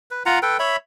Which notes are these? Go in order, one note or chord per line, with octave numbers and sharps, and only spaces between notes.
B4
F4 F#5 A#5
A4 B4 G5
C#5 E5 B5